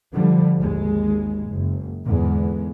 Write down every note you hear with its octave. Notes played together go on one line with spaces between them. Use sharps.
D3 F3 G3
G#1 D#2 G#3
F#1
E2 G#2 D3 G#3